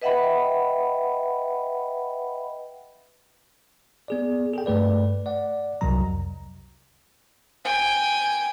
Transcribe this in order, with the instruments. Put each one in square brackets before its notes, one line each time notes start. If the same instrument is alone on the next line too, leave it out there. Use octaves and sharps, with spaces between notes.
[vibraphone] B4 D#5 E5 F#5 G5 B5
[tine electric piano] B3 G#4 D5
G#4 A4 G5
G2 A3 B4 D5
D5 F#5
C2 F2 C3 F#3 A#5
[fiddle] G5 G#5